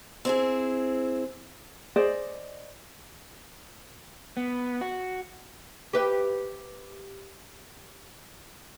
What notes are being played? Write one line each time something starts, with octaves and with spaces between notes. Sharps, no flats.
C4 E4 G#4
G#4 C5 D5 D#5
B3
F#4
G4 B4 E5